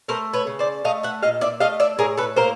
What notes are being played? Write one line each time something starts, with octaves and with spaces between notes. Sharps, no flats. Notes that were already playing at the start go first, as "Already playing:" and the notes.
A3 A#4 C5
B4 C#5
C#3
C5 D5
A3 D#5 F5
E5 F#5
A#2 D#5 F5
D5 E5
A3 D#5 F5
D5 E5
A2 G#4 A#4
A4 B4
A#3 A#4 C5